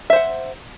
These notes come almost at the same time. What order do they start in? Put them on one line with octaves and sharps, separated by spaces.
E5 C5 F#5